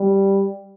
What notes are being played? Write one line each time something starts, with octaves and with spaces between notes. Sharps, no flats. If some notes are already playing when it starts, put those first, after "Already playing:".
Already playing: G3